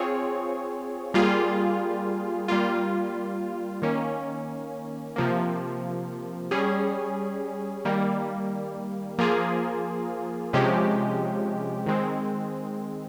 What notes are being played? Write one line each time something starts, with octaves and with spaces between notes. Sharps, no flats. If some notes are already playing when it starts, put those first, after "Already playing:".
Already playing: C4 F4 G#4 C#5
G3 A#3 F4 G#4
G3 A#3 F4
D#3 A#3 C#4
C3 F3 A#3
G3 C#4 G#4
D#3 G3 A#3
F3 A#3 F4 G#4
C3 F3 G#3 C#4 G4
D#3 G#3 C4